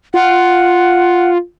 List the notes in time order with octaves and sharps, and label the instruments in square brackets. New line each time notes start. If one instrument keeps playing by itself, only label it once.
[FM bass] F4 [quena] F#5